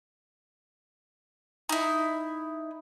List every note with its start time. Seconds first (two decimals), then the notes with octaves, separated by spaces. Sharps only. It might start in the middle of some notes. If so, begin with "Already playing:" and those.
1.69 D#4 E4